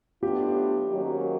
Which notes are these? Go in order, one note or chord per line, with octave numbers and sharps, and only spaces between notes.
A2 F#3 B3 D4 F4 G4
G#2 D#3 F#3 A#3 C#4